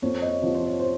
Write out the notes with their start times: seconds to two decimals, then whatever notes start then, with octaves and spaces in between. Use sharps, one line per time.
0.02 F2 C#5
0.22 D#5
0.28 C#5
0.42 C3 F3
0.54 C5
0.67 C#5
0.79 C5